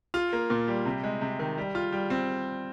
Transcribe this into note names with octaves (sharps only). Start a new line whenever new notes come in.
F4
A#3
A#2
G3
C3
G#3
C3
D#3
G3
F4
G3
C4